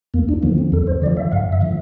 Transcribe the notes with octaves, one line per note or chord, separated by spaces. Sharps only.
E2 A#3
D4
D3 F3 A#3
C4
E2 A4
C5
D3 F3 D5
E5
G2 F5
E5
D3 F3